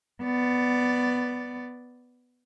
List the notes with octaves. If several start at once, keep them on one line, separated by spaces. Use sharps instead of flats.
B3 D5